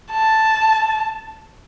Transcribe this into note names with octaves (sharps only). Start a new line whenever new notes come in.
A5